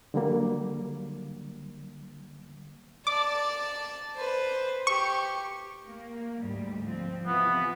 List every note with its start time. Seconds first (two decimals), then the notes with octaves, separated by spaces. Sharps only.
0.14 D3 F#3 G3 A#3
3.07 D5 A5 D6
4.16 B4 C5
4.87 G4 C#6
5.85 A#3
6.40 D2 G#2 G3
6.82 F3 C4
7.27 C3 E3 B3 F4